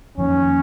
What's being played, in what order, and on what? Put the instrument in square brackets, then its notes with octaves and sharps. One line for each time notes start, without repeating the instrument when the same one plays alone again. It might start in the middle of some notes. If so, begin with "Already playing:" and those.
[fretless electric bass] F2 D#3 A#3 [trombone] C#4